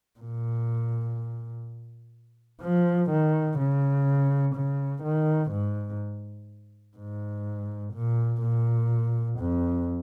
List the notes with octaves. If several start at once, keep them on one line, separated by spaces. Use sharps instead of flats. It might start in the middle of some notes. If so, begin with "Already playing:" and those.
A#2
F3
D#3
C#3
C#3
D#3
G#2
G#2
A#2
A#2
F2